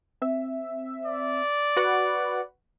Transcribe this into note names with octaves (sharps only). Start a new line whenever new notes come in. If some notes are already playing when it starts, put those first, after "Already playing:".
C4 E5
D5
F#4 B4 F#5